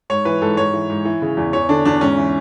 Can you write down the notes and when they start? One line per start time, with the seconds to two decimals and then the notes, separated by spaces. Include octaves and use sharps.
0.10 G#2 C#5
0.25 E3 B4
0.41 G#2 A4
0.57 G#2 C#5
0.73 E3
0.90 G#2
1.05 E3
1.22 C#3
1.37 E2
1.53 E2 C#5
1.69 D3 D4
1.85 E2 D4
2.01 G#2 C#4
2.17 E3